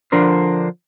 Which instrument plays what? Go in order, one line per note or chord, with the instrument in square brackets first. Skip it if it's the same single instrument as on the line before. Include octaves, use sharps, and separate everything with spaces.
[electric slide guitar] D3 F3 D4 A#4 C5